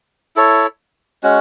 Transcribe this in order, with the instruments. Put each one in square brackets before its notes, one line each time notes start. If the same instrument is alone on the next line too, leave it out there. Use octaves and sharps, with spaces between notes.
[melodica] E4 A4 C#5
G#3 C#4 F#4